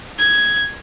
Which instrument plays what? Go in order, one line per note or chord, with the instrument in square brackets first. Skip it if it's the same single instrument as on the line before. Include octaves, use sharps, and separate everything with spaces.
[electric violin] G#6